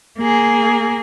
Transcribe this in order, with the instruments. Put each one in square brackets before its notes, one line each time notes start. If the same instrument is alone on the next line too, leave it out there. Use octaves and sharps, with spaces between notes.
[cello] A#3 G#4